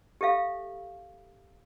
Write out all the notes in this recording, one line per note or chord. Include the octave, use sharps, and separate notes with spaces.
G4 A4 E5 F5